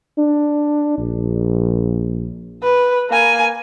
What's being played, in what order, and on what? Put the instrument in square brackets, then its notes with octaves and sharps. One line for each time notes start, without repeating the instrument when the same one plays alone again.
[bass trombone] D4
A#1
[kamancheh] B4
A#3 G#5